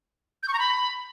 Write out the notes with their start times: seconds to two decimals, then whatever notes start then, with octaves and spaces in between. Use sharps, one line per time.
0.43 G6
0.48 C#6
0.54 A#5
0.59 B5